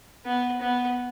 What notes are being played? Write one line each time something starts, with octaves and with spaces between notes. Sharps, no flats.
B3
B3